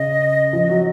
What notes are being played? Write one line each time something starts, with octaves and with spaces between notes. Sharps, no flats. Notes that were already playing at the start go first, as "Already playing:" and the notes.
Already playing: C#3 D#5
F3
F#3